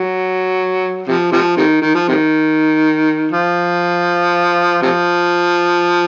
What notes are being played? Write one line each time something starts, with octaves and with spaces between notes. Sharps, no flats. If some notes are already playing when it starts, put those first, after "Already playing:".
Already playing: F#3
C3 F3
C3 F3
C3 D#3
D#3
F3
C3 D#3
F3
C3 F3